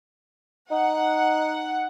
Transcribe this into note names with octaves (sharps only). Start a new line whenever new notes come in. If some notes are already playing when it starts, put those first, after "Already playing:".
D#4 F#5